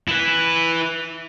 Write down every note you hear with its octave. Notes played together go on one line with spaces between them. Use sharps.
E4 B4